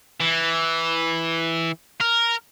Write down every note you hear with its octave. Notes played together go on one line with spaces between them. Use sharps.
E3
A#4